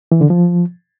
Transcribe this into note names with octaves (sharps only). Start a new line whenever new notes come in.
E3
D3
F3